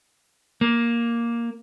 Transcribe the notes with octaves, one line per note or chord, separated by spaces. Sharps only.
A#3